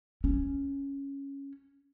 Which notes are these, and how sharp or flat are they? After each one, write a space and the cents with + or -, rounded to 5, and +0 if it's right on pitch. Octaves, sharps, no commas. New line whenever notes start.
C#4 +0